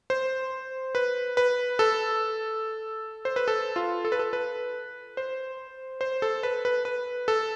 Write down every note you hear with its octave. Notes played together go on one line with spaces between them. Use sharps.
C5
B4
B4
A4
C5
B4
A4
F4
A4
B4
A4
B4
C5
C5
A4
B4
B4
B4
A4